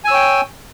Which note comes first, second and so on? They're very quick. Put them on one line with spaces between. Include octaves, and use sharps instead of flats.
G#5 E6 C#5 G5